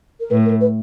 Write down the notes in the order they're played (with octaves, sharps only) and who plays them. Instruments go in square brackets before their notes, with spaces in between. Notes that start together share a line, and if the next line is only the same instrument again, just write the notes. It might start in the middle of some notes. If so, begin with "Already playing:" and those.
[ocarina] A#4
[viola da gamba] A2 [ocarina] B4
[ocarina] A#4
B4